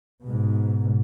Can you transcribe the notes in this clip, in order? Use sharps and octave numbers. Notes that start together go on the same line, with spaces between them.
G#2 B2